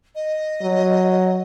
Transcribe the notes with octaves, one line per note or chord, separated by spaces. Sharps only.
D#5
F#3